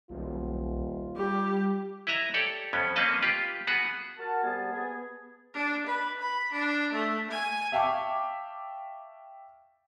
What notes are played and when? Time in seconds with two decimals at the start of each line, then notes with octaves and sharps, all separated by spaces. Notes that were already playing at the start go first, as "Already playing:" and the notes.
0.10 D#1 B1 F4
1.16 G3 G4
2.07 E4 B4 D#5 E5 A#5
2.34 G4 A4 C#5 D5
2.73 F2 B3 C#4
2.96 A#3 C4 C#4 B4 D#5 A5
3.23 F4 G4 B4
3.67 B3 F#4 G#4 B4
4.18 F#4 A#4 A5
4.44 C3 G3 B3 G#4 G#5 A5
4.71 B3 G#4
5.54 D4
5.86 B4
6.20 B5
6.52 D4
6.93 A3
7.30 G#5
7.72 E5 F5 G5 A5 C#6 D6